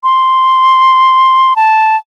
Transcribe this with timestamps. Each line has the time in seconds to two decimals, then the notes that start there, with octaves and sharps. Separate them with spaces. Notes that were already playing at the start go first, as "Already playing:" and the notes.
0.03 C6
1.56 A5